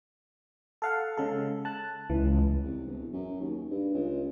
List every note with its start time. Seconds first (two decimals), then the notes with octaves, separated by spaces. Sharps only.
0.82 A4 F5 F#5
1.17 C#3 G#3 A4
1.65 A5 F#6
2.10 C#2 E3
2.64 C2
2.87 E1
3.13 F#2
3.40 D#2
3.71 G2
3.94 C#2